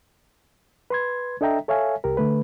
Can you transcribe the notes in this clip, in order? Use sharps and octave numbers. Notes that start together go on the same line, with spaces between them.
B4 C6 G#6
D4 A4 D#5 E5 G5 A#5
A4 C#5 E5 F5 G#5
C2 G4 A#4
D3 A3 B4